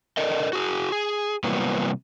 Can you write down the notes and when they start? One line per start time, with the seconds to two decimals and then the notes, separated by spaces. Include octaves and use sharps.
0.17 A4 A#4 D5 D#5
0.53 F#4 G#4
0.92 G#4
1.44 C3 E3 F#3 G3 A#3 B3